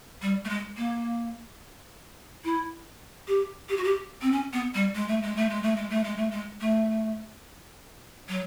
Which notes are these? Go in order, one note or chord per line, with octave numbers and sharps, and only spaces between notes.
G3
A3
G#3
A#3
E4
G4
G4
F#4
G4
C4
C#4
B3
G3
G#3
A3
G#3
A3
G#3
A3
G#3
A3
G#3
A3
G#3
A3
F#3